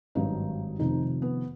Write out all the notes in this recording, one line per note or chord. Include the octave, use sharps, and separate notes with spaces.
G#1 G2 D#3 F#3 D#4
F1 F2 C3 D#3 D#4
B3